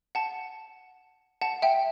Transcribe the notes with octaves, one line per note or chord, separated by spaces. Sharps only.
F#5 A5
F#5 A5
E5 G5